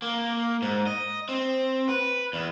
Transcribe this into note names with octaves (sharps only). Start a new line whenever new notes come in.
A#3
G#2
D#5
C4
B4
E2